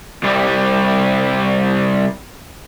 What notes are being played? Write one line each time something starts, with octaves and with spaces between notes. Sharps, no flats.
C2 G3